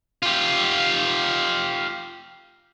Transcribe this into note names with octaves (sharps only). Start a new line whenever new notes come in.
F4 G4